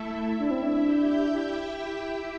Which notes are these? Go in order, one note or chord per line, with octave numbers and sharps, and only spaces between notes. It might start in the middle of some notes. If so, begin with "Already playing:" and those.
Already playing: A3 E4 A4 E5
E4 E5
D4
C4
D4
G4 G5